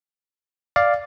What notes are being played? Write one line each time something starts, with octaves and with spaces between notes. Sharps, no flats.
D5 F5